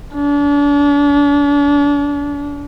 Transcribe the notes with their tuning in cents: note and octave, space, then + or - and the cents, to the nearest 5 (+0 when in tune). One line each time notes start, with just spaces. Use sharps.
D4 -35